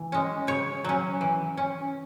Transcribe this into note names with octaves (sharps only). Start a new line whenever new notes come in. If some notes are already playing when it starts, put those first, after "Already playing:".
Already playing: E3
G#3 C#4
C#3 C#5
F#3 C#4
E3
C#4